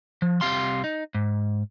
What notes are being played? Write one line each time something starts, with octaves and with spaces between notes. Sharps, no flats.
F3
C2 A3 C4 G4 F5 C6
D#4
G#2